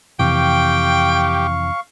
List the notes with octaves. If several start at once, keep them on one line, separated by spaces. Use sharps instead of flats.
F2 C3 E3 G4 F5 G5 C#6